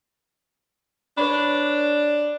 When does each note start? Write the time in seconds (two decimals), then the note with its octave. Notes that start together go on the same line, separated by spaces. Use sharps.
1.17 D4 B4 C#5 B5